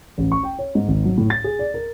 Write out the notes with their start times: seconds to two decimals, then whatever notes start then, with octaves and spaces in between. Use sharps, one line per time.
0.18 A1
0.32 C#6
0.43 G5
0.59 C#5
0.75 G#2
0.88 G#1
1.05 F#3
1.17 A2
1.30 A6
1.44 G#4
1.59 D5
1.74 A#4